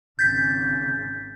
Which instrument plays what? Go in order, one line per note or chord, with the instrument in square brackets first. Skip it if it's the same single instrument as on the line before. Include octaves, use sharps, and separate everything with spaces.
[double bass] G#1 C#3 [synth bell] G6 A6 B6